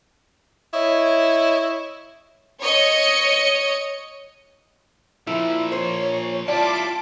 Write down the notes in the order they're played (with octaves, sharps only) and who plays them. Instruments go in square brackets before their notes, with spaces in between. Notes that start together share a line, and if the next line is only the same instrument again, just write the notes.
[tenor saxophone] E4 [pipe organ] C#5 D#5
[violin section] C#5 D#5 C#7
[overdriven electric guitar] A#2 F3 [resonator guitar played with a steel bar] E4 E5
[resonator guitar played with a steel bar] C5 [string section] C#5
[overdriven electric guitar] E4 G4 [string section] F4 A5 D6 [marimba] D5